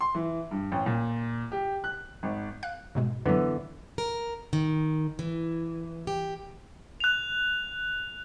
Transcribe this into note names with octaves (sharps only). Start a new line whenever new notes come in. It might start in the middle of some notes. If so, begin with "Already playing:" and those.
C6
E3
G2
A1
A#2
G4
F#6
G#1
F5 F#6
G#2 B2 G#3
F#2 D3 E3 F#3 B3
A#4
D#3
E3
G4
F#6 F7